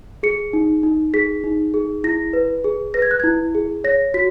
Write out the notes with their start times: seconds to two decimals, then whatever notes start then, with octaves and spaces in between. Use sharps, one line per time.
0.23 G#4 C#7
0.53 D#4
0.83 D#4
1.14 G#4 B6
1.44 D#4
1.74 G#4
2.04 E4 A#6
2.33 B4
2.64 G#4
2.94 B4 A#6
3.02 G#6
3.11 F#6
3.20 E4 G#6
3.55 G#4
3.84 C#5 A#6
4.14 F#4 B6